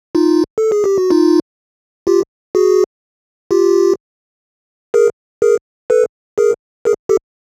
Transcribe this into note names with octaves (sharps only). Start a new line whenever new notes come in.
D#4 F4
A4
G#4
G4
F#4
D#4 F4
F4 G4
F#4 G#4
F4 G4
G#4 A#4
G#4 A#4
A4 B4
G#4 A#4
G#4 A#4
G4 A4